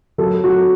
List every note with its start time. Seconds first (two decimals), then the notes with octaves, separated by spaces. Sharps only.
0.18 F#3 A4
0.44 F#3 F#4